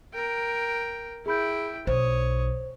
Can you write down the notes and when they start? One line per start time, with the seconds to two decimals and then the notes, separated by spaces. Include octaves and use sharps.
0.14 A#4 G5
1.26 E4 G#4 G5 B5 G6
1.87 B1 C5 C#5 D#6